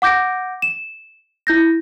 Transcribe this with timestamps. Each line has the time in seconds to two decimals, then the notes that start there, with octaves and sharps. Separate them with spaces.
0.02 F#5 D6 G6 A#6 D7
0.62 E7
1.47 E4 G6 A#6